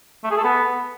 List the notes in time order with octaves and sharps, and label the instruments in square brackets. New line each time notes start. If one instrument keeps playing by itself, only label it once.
[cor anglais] A3
G#4
A4
B3